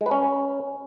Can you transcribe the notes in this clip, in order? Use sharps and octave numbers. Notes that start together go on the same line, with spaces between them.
G#3
B4
C#4